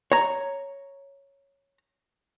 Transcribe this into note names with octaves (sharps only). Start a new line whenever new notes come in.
C#5 A#5